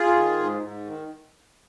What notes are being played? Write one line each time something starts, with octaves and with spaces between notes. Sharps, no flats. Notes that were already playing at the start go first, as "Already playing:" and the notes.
Already playing: F4 G#4
D#3
G#2
G#2
D#3